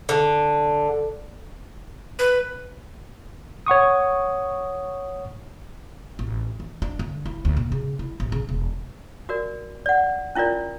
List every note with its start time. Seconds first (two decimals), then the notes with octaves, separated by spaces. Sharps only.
0.09 D3
2.19 B4
3.66 C#5 F#5 C#6 D#6
6.19 A1
6.60 E3
6.82 D4
6.99 D3
7.26 E4
7.45 D2
7.57 A#2
7.72 C#3
7.99 E4
8.20 A1
8.32 C#3
8.49 E1
9.29 F#4 A#4 D5
9.86 D5 F#5
10.35 C#4 E4 F4 A#4 D5